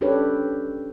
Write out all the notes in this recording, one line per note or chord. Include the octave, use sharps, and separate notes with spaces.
C#4 D4 G4 A4 B4 C#5